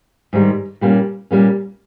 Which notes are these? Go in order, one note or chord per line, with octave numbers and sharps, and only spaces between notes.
G#2 D#3 G3
A#2 G3 A#3 C#4
A#2 G3 A#3 C#4